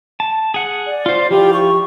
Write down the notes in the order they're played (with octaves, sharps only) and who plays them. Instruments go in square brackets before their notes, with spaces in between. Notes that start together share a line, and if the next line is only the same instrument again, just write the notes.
[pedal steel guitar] A5
G#4 F#5
[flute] D5
[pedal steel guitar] F4 C5
[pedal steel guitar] F3 E4 F4 [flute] G4
[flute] C#6